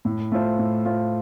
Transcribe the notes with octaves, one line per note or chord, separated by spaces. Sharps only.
A2
A3 F4 C5
A2
A3 F4 C5